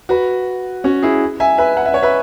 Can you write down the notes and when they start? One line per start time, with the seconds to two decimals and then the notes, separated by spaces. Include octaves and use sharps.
0.09 F#4 B4
0.84 C#4 F#4
1.02 E4 G#4
1.40 E5 G#5
1.58 B4 E5
1.77 F#5
1.86 E5
1.94 C#5
2.03 B4 E5